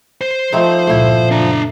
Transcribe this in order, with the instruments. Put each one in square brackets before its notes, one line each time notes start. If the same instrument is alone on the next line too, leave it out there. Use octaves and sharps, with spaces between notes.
[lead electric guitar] C5
[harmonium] F3 [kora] A3 C4 D#4
[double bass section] C#2 G2 A#2 [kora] A3 E4
[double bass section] F#1 [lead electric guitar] D4 A#5